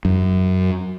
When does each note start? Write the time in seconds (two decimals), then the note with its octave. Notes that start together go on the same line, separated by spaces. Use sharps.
0.05 F#2